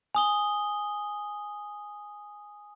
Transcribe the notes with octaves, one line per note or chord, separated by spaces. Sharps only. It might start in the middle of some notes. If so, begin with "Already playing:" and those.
G#5 D#6 G7